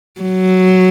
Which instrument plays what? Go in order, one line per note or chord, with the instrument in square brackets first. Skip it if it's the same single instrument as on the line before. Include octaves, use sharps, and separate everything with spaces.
[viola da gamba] F#3